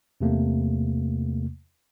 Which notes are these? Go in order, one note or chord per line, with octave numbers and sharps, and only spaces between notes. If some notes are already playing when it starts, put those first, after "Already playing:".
E2 C3 A3 A#3